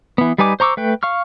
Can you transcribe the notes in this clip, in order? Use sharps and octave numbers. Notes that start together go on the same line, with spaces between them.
E3 B3
G3 D#4 B4 G#5 D6
C5 A#5 C#6 D6 E6
A3 B4 G5
F5 C#6 F6